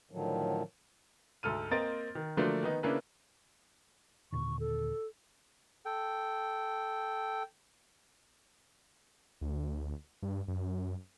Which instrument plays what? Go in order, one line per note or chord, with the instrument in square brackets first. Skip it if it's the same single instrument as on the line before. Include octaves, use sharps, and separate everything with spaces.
[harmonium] A2 D3 D#3 F3 F#3
[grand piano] D2 G#2 A4 F6 D#7
A#3 C4 A#4 D#5 A6 D7
D#3
D3 F3 F#3 A3 A#3 D4
D#3 B3 D#4
C#3 A#3 C#4 D4 E4 B4
[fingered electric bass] D#2 A#2 D3 [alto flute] C#6
[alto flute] A4
[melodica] A4 G5
[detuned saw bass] D2
G2
F#2